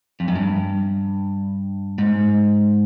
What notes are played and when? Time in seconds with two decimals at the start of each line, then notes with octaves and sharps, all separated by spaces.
0.20 F2
0.28 F#2
0.36 G2
1.98 G#2